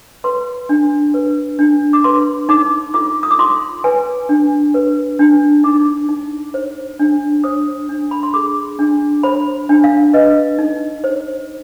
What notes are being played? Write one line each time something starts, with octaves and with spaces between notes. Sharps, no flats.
B4 C6
D4
B4
D4
D6
B4 C6
D#4 D6
F4 D6
D#6
D6
F4 C6
B4 G#5
D4
B4
D4
D#4 D6
D#4
C5
D4
C5 D#6
D4
B5
C6
G#4 D6
D4
C5 B5
D4
F5
B4 D#5
D#4
C5